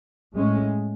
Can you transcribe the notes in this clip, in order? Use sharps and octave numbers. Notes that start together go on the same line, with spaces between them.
A2 G#3 C#4